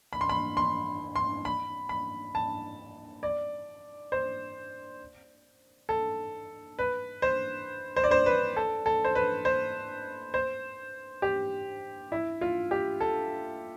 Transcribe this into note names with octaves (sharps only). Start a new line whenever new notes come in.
B5
C6
B5
C6
C6
B5
B5
A5
D5
C5
A4
B4
C5
C5
D5
C5
B4
A4
A4
C5
B4
C5
C5
G4
E4
F4
G4
A4